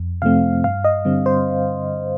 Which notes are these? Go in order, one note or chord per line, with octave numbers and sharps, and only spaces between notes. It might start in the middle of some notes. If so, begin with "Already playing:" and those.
Already playing: F2
C3 F3 A3 C4 F5
G2 F5
D#5
D3 G3 C4
C5